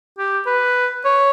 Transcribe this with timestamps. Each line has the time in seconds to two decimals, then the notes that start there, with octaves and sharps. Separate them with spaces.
0.18 G4
0.46 B4
1.05 C#5